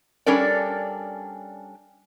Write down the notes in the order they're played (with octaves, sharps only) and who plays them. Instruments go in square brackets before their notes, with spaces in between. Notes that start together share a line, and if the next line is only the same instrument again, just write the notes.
[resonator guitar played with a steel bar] G3 C#4 D4 A4 A#4 D5